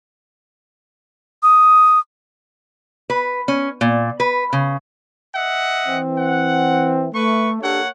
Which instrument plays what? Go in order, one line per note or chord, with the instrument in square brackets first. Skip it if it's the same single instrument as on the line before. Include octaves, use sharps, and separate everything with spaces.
[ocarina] D#6
[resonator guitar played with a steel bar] B4
C#4
A#2
B4
C#3
[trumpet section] D#5 E5 F#5
[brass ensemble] E3 C4
[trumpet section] F#5
[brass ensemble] A3 [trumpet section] B4 C#6
[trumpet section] A#3 C#5 F#5 [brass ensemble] D4 G4 A4